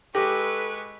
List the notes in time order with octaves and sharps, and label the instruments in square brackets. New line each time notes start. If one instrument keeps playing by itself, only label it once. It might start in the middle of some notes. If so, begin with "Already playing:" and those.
[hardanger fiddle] G#3 C#6 [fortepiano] G4 [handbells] A4 [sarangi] B4